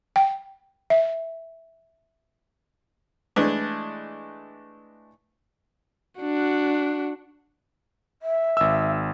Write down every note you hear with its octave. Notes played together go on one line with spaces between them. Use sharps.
G5
E5
E3 G#3 A3 D4
D4 F#4
E5
G#1 E6